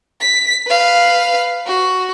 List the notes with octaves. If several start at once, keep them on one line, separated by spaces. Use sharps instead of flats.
B6
B4 F5
F#4